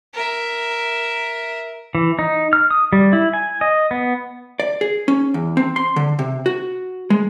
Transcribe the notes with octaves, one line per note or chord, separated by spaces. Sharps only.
A#4 E5
E3
D#4
F6
D#6
G3
E4
G#5
D#5
B3
D5
G#4
C#4
E2
C4
C6
D3
C3
F#4
G#3